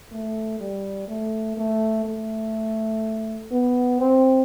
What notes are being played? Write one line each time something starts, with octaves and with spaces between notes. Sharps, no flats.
A3
G3
A3
A3
A3
B3
C4